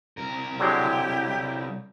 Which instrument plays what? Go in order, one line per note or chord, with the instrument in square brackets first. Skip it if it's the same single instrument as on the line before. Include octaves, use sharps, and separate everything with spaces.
[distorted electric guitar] C2 A#4
[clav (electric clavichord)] D3 F#3 G#3 [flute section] E4 G4